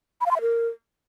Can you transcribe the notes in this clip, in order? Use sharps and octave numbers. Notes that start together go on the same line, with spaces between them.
B5
F5
C6
E5
A#4